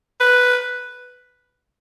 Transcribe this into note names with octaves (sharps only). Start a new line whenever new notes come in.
B4